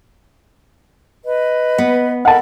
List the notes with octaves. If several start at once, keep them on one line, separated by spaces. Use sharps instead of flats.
B4 D#5
B3
A4 A#4 F#5 A5 B5